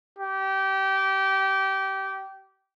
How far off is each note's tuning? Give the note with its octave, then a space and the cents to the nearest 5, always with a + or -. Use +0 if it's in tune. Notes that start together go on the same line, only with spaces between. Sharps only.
G4 -20